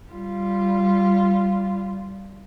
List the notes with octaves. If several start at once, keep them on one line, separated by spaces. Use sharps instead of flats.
G3 F4